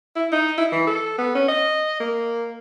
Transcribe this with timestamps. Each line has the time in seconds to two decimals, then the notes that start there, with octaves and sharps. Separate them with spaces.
0.16 E4
0.32 D#4
0.58 E4
0.72 E3
0.87 A4
1.18 B3
1.35 C#4
1.48 D#5
2.00 A#3